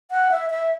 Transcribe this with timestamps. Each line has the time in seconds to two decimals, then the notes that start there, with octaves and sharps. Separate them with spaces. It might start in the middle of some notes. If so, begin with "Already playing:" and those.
0.11 F#5
0.31 E5
0.50 E5